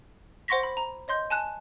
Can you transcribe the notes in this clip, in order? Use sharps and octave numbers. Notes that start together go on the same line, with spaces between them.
C5 F#5 C6 C#6 A#6 B6
B5
A#5
C#5 D#5 C6 G6
G#5 A5 F#6